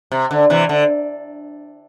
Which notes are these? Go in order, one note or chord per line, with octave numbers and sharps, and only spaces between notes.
C3
D3
C3 E3
D3